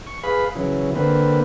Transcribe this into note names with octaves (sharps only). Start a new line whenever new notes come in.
C#6
G#4 B4 F5 B5
C#3 E3 F#3
D3 A#3 C4 B4